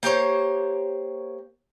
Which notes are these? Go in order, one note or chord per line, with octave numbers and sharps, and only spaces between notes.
A#3 G4 C5 C#5